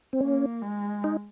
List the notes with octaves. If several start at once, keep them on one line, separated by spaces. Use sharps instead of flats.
C4
A#3 C#4
G#3
D#4